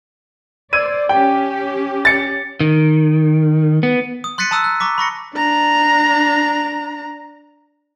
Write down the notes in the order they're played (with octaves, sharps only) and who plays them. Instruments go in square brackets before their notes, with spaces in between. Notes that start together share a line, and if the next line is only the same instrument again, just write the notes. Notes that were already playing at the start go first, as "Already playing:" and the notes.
[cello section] C5 D5 [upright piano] E6 G#6 D#7
[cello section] C#4 G4 [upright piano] G5
[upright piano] A6 C#7
[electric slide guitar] D#3
B3
[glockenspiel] D#6
C6 F#6 A6 B6 C#7 D#7
A5 A#5 D#6 E6 F#6
F#6
A#5 C#6 D6 B6
B5 C#6 A#6 C#7
[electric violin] D4 A#5